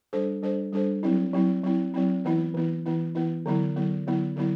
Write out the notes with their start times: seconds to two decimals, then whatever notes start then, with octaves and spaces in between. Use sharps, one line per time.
0.13 G3 D4 A4 C5
0.42 G3 D4 A4 C5
0.73 G3 D4 A4 C5
1.03 F#3 C4 E4
1.33 F#3 C4 E4
1.64 F#3 C4 E4
1.94 F#3 C4 E4
2.25 E3 B3 E4
2.54 E3 B3 E4
2.86 E3 B3 E4
3.15 E3 B3 E4
3.46 D3 F#3 B3 E4
3.76 D3 F#3 B3 E4
4.07 D3 F#3 B3 E4
4.36 D3 F#3 B3 E4